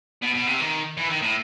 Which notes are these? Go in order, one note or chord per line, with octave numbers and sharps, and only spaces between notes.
B2
B2
C3
D#3
E3
D#3
A2